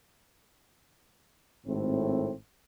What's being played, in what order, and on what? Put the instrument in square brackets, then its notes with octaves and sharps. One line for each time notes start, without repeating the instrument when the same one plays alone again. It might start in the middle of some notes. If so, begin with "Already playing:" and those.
[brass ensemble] G#1 A2 C4